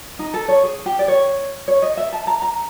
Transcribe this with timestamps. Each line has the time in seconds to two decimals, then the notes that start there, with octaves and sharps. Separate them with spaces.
0.19 D#4
0.34 A4
0.48 C#5
0.64 G#4
0.86 G4
0.99 D5
1.08 C#5
1.68 C#5
1.82 D#5
1.97 E5
2.13 A5
2.27 A#5
2.42 A#5